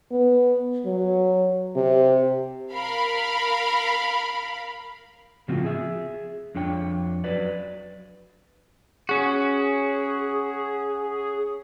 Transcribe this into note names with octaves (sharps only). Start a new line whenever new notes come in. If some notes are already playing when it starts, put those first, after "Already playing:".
B3
F#3
C3
A#4 F5 B5
A2 C#3 F3 C4 F#4
G#4 E5
F2 D4 C#5 G5
F#3 B4 D5
C#4 F#4 G#4